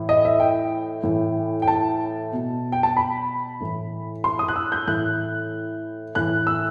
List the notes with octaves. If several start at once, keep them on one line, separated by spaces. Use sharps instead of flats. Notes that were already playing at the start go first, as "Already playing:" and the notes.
Already playing: A2 E3
D#5
E5
G5
A2 E3
G5
A5
B2
G5
A5
B5
A2 E3
C6
D#6
F#6
E6
G6
A2 E3 F#6
A2 E3 F#6
E6